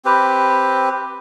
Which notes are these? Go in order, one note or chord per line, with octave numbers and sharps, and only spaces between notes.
C4 G4 B4